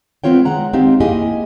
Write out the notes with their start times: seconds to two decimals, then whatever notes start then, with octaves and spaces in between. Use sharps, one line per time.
0.24 G#3 B3 C4 F4 C#5 G5
0.45 D#3 G#3 F#5 A#5
0.73 G#3 C4 D#4 G4 F5
1.00 A#3 E4 G4 G#4 D#5 G#5